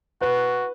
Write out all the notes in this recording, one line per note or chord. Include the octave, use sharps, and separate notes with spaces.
F#4 B4